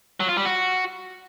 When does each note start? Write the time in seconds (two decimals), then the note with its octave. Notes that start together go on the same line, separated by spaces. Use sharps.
0.20 F#3
0.29 F4
0.37 G3
0.45 F#4